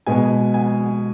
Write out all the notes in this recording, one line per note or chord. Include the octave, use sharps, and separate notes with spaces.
B2 G#3 B3 G#5
G#5